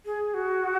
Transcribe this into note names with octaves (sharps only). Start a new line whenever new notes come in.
G#4
F#4